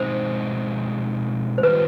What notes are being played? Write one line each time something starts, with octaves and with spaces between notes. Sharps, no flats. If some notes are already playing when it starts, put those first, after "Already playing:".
Already playing: B2 G#3 C4 D#4 C5
C5
D#3 G3 B3 F4 B4